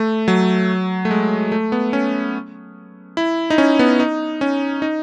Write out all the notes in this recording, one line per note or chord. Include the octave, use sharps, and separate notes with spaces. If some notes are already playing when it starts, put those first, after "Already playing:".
Already playing: A3
F#3
A3
G#3
A3
B3
C#4
E4
D#4
C#4
B3
D#4
C#4
D#4